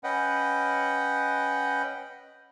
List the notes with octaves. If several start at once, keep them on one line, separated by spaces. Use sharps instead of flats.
C#4 B4 D#5 F#5 G5